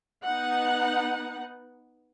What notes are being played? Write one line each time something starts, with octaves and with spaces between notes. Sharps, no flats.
B3 D#4 F#5